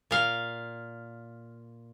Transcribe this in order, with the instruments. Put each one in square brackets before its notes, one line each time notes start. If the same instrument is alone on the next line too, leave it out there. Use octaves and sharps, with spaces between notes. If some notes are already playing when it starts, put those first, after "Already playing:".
[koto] A#2 F5